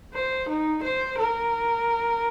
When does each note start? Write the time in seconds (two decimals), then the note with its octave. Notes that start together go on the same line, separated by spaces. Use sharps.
0.14 C5
0.49 D#4
0.83 C5
1.18 A#4